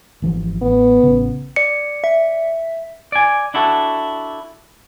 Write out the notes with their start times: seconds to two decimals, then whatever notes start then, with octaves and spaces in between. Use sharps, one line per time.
0.22 G#1 E3 F3
0.62 A1 B3
1.03 A1 C#3
1.56 D5 C#7
2.04 E5
3.12 D5 G#5
3.54 D4 E4 F#4 A4